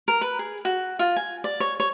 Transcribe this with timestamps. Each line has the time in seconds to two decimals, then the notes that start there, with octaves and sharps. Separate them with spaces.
0.08 A#4
0.21 B4
0.39 G#4
0.65 F#4
0.99 F4
1.16 G#5
1.44 D5
1.60 C#5
1.80 C#5